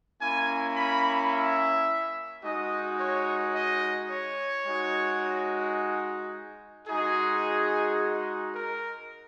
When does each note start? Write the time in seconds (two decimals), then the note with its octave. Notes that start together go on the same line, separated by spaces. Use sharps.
0.22 A#3 C#4 E4 G#5
0.76 B5
1.32 E5
2.43 G#3 D#4 F#4 D#5
2.99 C#5
3.54 D#5
4.11 C#5
4.66 G#3 D#4 F#4
6.88 G#3 D#4 F#4 G#4
8.55 A#4